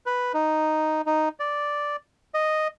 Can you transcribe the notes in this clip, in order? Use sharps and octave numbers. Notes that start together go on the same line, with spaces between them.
B4
D#4
D#4
D5
D#5